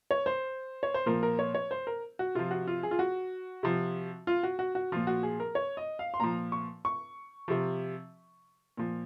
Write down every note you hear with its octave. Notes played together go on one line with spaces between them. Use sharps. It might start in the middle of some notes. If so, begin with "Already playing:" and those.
C#5
C5
C#5
C5
A#2 F3 A#4
A#4
C#5
C#5
C5
A#4
F#4
C3 F3 F4
F#4
F4
G#4
F4
F#4
C3 F3
F4
F#4
F#4
F#4
A#2 F3 F4
F#4
G#4
A#4
C#5
D#5
F5
C6
A#2 F3 A#5
C#6
C#6
C3 F3
A#2 F3